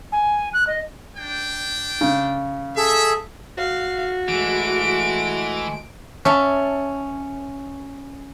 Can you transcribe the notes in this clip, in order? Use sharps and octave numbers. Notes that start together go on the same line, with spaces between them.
G#5
F#6
D#5
D4 G5
C#3
G#4 A4 E5
F#4 F5
E3 G#3 A3 G#4 D7
C#4 E5 A5